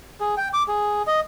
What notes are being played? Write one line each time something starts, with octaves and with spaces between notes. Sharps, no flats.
G#4
G5
D6
G#4
D#5